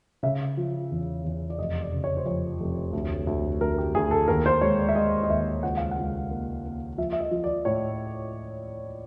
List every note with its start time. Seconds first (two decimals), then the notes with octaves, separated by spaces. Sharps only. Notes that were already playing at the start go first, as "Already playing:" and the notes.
0.23 C#3 E5
0.57 F3
0.91 E2
1.25 E2
1.50 D5
1.59 F1 D#5
1.81 D5
1.92 C#3
2.04 C#5
2.17 C5
2.26 F2 C#5
2.60 F1
2.93 D2
3.27 D2
3.61 D2 A#4
3.78 G4
3.95 D2 G#4
4.11 A4
4.28 D#2 A#4
4.46 C5
4.61 G#3 C#5
4.79 D5
4.89 E5
4.95 G#3 D#5
5.23 D#5
5.30 D#2 E5
5.63 C#2 F#5
5.77 F5
5.91 F#5
5.97 C#2
6.31 A#3
6.65 A#3
6.98 F3 E5
7.12 E5
7.20 D#5
7.31 F3
7.44 D5
7.65 A2 C#5